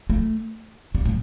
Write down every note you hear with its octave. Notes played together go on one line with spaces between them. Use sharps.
A3
G3
A2